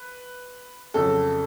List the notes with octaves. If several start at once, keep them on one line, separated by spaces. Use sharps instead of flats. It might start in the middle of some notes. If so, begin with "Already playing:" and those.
Already playing: B4
F2 C#3 F#3 A4